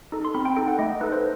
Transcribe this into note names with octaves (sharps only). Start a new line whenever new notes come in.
D#4 A4
C6
C4 B5
G5
D#4 A4 G5
F#5
A3 D#5
D#4 A4 B4
C5